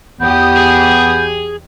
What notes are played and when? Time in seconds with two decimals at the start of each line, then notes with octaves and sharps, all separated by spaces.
0.20 E2 B3 G4 D#6 G6
0.57 G#4